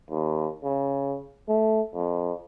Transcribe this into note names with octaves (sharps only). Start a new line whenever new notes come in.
D#2
C#3
A3
F2